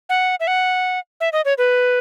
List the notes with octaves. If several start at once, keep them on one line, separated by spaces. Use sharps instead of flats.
F#5
E5
F#5
E5
D#5
C#5
B4